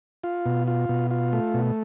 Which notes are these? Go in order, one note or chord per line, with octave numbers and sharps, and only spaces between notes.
F4
B2
F4
B2
F4
A3
B2